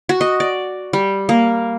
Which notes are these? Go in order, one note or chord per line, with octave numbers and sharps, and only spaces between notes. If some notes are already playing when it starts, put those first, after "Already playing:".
F#4
D#5
D5
G3
A#3